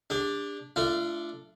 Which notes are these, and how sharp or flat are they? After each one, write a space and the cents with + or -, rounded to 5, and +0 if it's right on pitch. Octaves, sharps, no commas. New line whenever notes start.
D4 +0 G4 +45
A3 +0 D4 +0 F4 -30